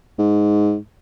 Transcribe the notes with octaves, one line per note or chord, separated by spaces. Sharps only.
G#2